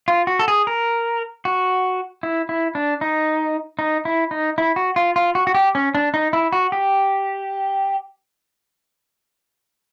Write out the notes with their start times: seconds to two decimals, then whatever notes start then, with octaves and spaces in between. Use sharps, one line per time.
0.08 F4
0.27 F#4
0.39 A4
0.48 G#4
0.67 A#4
1.45 F#4
2.23 E4
2.49 E4
2.75 D4
3.01 D#4
3.79 D#4
4.05 E4
4.31 D#4
4.58 E4
4.76 F#4
4.96 F4
5.16 F4
5.35 F#4
5.47 F#4
5.55 G4
5.75 C#4
5.95 D4
6.14 D#4
6.33 E4
6.53 F#4
6.72 G4